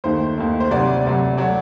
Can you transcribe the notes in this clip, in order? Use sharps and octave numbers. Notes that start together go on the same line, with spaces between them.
D#2 D#3 A3 C5
D#2 D#3 A3
C5
D2 C3 F#3 D5
D2 C3 F#3
F#3 A3 D5